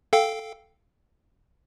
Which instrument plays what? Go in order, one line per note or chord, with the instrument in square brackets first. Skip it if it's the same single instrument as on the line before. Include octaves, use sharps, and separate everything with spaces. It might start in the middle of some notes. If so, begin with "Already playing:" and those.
[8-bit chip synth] A4 F5 G5